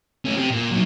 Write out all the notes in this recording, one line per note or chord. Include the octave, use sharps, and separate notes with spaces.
A3 C#4
C4 G4
A#2
F#3 D#4